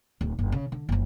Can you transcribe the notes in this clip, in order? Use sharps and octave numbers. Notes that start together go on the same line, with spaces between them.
D1
F#1
C#3
D3
F#1 F3